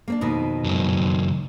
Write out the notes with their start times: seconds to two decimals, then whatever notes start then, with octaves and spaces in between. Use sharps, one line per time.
0.08 A#3 C4 D4
0.21 F2 B2 D#3
0.64 C#2 F#2